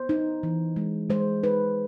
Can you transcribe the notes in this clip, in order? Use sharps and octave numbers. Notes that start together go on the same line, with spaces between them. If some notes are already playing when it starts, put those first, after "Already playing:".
Already playing: B3 C5
D#4
E3
G#3
G#3 C5
D#4 B4